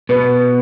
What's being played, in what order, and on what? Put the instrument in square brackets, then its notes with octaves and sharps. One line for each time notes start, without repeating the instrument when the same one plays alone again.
[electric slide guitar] B2 [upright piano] B3